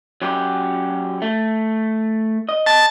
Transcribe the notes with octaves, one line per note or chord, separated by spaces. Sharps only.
F#3 C#4 G4
A3
D#5
A5